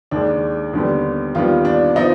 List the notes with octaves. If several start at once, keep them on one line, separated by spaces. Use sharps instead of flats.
D#2 D#3 G#3 D4
D#2 D3 G3 B3
D#2 D#3 G3 B3 F4
D4
F3 B3 D#4